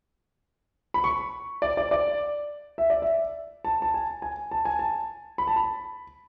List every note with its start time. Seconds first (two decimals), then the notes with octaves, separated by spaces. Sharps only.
0.94 B5
1.04 C#6
1.62 D5
1.77 D5
1.91 D5
2.78 E5
2.90 D5
3.02 E5
3.65 A5
3.82 A5
3.94 G#5
4.22 G#5
4.51 A5
4.65 G#5
4.79 A5
5.38 B5
5.47 A5
5.56 B5